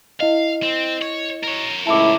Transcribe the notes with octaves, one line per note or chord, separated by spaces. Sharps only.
E4 D#5 F5
C4
C#5
A#4 C#5
C#2 A2 E4 A5 D6